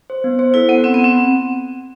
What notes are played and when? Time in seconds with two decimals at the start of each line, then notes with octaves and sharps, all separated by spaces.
0.10 C5
0.24 B3
0.39 C5
0.54 E4 A4
0.69 B3 F#5
0.84 C4 F#5
0.94 B3
0.99 F#5
1.04 C4